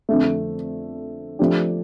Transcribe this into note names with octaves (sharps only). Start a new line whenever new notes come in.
F2 D3 A3
F3 A3 D4 G4